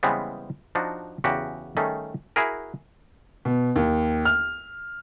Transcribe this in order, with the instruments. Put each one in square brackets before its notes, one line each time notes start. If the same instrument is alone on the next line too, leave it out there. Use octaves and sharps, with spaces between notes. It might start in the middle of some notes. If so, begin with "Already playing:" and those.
[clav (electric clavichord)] C#3 E3 G3 G#3 B3 C4
F3 D4 D#4 F#4
E2 C#3 F#4 G4
D#3 G3 A3 C#4 G#4 A4
E4 F#4 G#4 A#4
[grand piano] B2
D#2
F6